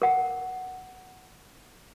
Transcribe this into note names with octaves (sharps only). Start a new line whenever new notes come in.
A#4 F#5